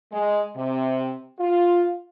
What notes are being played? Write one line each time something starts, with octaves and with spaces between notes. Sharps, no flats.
G#3
C3
F4